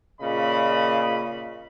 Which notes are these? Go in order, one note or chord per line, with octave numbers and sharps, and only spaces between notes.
A#2 C#3 D#5 B5